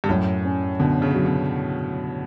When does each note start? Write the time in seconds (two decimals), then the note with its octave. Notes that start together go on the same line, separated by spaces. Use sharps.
0.04 G2
0.09 F#2 A2
0.45 C#4
0.80 B2 D3
1.02 C#3
1.14 F#3
1.25 B2